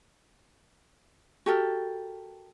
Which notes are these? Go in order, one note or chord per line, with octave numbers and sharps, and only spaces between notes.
F#4 G4 A4 A#4